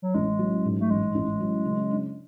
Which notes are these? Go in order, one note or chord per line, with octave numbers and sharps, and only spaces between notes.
F#3
A1 G#3
F#3
G#2
A3
A1 G#3
A1
F#3
C#3
D4